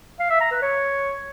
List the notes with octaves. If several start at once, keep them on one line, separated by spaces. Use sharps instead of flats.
F5
E5
A#5
B4
C#5